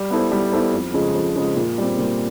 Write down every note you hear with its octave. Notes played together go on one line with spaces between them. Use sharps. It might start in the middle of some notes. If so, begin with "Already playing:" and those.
Already playing: G3
B3 E4 A4 C5
G3
B3 E4 A4 C5
F2
C#3 F3 G#3
F2
C#3 F3 G#3
A#2
G3 C4
A#2